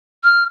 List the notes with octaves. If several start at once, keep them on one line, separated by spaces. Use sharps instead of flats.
F6